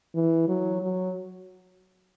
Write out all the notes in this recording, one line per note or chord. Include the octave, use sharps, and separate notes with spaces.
E3
F#3
F#3